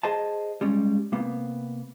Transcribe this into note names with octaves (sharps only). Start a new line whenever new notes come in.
G#4 C5 D#5 A5
G3 G#3 C#4
C3 A#3 B3